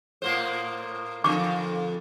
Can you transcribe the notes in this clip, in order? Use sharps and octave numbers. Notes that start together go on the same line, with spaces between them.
A2 A#3 C5
F2 D3 C#6 D6